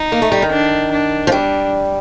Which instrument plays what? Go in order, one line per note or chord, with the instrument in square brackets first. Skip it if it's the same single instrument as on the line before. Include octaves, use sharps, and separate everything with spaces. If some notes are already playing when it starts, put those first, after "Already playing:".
Already playing: [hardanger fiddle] D#4
[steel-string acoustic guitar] A#3
A3
G3
D#3
[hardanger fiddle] D4
D4
[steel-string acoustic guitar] F3
[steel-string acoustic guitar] G3 [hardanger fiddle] D4